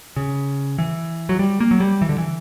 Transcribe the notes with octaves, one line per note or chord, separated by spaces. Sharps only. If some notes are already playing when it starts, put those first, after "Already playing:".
C#3
E3
F#3
G3
A#3
F#3
G3
E3
D3
E3